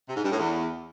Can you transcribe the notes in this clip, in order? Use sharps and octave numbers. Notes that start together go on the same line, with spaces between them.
C3
G#2
G2
A2
E2